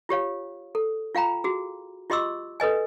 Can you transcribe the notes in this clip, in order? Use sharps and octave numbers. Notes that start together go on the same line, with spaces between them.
F4 G4 C#5 F5
A4
F4 F5 G5 A#5 B5
F#4 G#4
F4 G4 D#5 C6 D6 E6
A4 B4 D#5 G#5